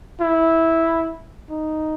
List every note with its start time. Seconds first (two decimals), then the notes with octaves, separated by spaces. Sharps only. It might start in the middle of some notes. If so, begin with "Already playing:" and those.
0.21 E4
1.50 D#4